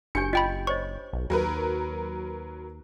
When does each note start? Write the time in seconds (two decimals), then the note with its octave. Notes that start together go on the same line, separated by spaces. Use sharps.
0.15 F#1 D4 G4 G#5 G6 C#7
0.33 F4 D#5 G5 B5
0.67 C5 C#5 D#5 C#6
1.13 B1
1.30 D#2 F#3 A#4 B4